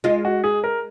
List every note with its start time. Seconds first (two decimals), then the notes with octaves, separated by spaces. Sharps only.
0.04 G#3 F4
0.25 F#4
0.44 G#4
0.64 A#4